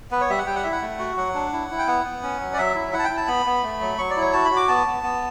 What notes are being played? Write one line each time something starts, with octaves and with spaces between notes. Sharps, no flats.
B3 B4
C#5
G3 E5
F#5
G3 G5
F#5
E4 E5
F#5
A3
F#4
F#3 F#5
D4
E4
E4
G5
B3 F#5
B3
C#4
F#3
D5
F#3 E5
E4
E4 F#5
A5
G5
E4
A5
B3 B5
B3
A3
F#3
F#3 C#6
D5
E4
C#5
F#4 A5
B5
F#4
D6
B3 A5
B3
B3